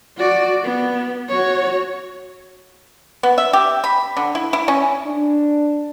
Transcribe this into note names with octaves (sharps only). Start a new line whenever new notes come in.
F#4 D5
B3
F#4 C#5
B3
E5
G4
B5
D3
E4
E4
C#4
D4